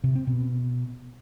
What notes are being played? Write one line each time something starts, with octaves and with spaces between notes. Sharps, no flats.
C3
C4
B2